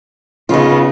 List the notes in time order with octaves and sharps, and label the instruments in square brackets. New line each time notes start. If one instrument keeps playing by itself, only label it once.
[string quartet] C#3 B3 [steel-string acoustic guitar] D#4 F4